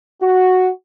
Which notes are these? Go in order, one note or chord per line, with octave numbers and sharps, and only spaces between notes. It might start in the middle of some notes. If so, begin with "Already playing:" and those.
F#4